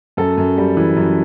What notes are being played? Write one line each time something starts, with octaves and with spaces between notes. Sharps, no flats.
F#2 A4
F#2
G3
E3
F#2